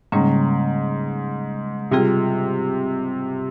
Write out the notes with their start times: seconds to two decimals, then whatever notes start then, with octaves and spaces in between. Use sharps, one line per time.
0.12 G#2 C#3 G3 A#3 C#4
1.91 C3 G3 C4 F4 G#4